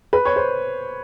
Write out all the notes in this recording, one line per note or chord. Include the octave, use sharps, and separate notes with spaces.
B4
C#5
C5